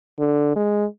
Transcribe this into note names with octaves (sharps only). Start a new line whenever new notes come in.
D3
G#3